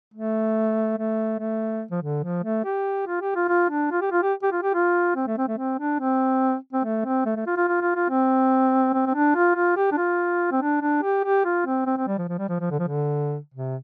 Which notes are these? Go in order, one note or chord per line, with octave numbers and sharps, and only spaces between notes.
A3
A3
A3
F3
D3
F3
A3
G4
F4
G4
F4
F4
D4
F4
G4
F4
G4
G4
F4
G4
F4
C4
A3
C4
A3
C4
D4
C4
C4
A3
C4
A3
A3
F4
F4
F4
F4
F4
C4
C4
C4
D4
F4
F4
G4
D4
F4
C4
D4
D4
G4
G4
F4
C4
C4
C4
G3
F3
F3
G3
F3
F3
D3
F3
D3
C3